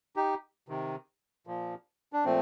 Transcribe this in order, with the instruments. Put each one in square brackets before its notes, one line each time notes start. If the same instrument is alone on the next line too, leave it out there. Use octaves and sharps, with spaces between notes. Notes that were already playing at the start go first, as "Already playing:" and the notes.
[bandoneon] D#4 G4
C3 D#3
A#2 F3
D4
A#2 F3 A3 C4